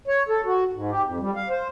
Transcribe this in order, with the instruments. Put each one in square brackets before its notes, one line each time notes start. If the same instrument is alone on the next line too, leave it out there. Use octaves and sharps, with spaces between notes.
[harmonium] C#5
A4
F#4
G#2
G4
F2
G3
F5
C5